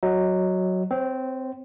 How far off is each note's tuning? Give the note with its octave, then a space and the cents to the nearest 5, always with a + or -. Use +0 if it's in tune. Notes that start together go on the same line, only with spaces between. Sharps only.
F#3 +0 D#5 +15
C4 -15 C#5 -40